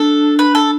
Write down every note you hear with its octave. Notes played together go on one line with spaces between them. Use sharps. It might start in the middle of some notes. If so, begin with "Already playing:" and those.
Already playing: D4 A4
B4
A4